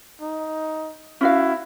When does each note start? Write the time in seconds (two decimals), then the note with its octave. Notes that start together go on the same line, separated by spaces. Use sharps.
0.21 D#4
1.21 C#4 E4 F#4 F5